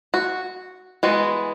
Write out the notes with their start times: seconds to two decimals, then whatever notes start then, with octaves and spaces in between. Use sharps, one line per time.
0.14 F#4
1.03 E3 G#3 B3 F#4